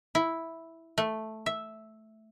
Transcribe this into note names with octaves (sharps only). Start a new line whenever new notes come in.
E4
A3
E5